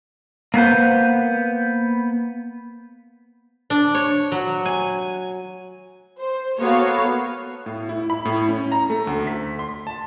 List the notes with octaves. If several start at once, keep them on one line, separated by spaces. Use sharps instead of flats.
A#3 B3 B4 C5
D4
C#5
F#3
G#5
C5
A#3 B3 F#4 A4 C#5 F5
A2
E4
B5
A2
C#4
A#5
A3
D2
B6
C6
A5